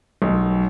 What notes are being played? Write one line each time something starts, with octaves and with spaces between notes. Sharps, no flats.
B1